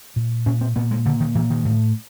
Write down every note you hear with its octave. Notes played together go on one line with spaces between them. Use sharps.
A#2
A#2 C#4
C4
A#2 B3
G#3
A#2 D3
D#3
A#2 E3
D#3
A2